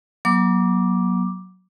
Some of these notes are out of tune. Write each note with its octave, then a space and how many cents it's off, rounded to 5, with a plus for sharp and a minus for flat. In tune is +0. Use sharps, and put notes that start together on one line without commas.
F#3 +0 A#3 +45 D6 +0